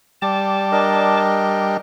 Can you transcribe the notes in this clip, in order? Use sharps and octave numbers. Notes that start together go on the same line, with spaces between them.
G3 D5 A5 D6
D4 A#4 D#5